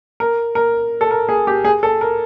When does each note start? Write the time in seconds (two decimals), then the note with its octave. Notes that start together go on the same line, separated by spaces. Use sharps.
0.20 A#4
0.55 A#4
1.01 A4
1.11 A#4
1.29 G#4
1.47 G4
1.65 G#4
1.83 A4
2.01 A#4